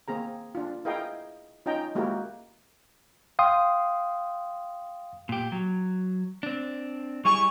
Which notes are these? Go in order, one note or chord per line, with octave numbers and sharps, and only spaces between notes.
A#3 C4 G#4 A#5
D4 F4
E4 G#4 A#4 D#5 F5 G5
C#4 D#4 F4 D#5 G5 A#5
G#3 A#3 E4 F#4 G4 A#4
F5 G5 C6 D#6
A#2 G4
F#3
C4 D4
G3 E4 G#4 C#6